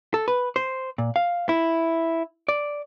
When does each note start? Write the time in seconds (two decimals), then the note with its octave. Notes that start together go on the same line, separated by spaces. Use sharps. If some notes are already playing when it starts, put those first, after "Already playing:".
0.14 A4
0.28 B4
0.56 C5
0.98 A#2
1.16 F5
1.49 E4
2.49 D5